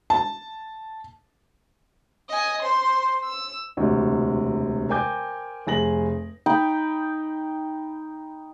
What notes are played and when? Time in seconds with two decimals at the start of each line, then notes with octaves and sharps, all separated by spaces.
0.10 A5
2.29 D#5 G#5
2.62 C5 C6
3.24 E6
3.77 E1 D2 C3
4.89 A#4 C5 G5 G#5 D6 G6
5.67 F1 G#4 A#6 F#7
6.46 D#4 G5 B5